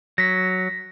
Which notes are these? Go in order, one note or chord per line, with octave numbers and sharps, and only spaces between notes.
F#3 A#6 B6